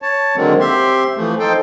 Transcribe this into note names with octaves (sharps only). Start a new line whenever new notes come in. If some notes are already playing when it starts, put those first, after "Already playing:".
C#5 A5
D3 D#3 F#3 G#3 A#3 C4
C4 G4 E5 C6
E3 F3 A3
D#4 A4 C5 G5